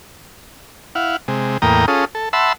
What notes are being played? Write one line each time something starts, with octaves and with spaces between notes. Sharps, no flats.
E4 F5 F#5
C3 G#3
E2 A2 A#3 G5 A#5 D#6
C#4 F4 G#4 A4 D#6
A4
E5 F#5 A5 B5 C6 E6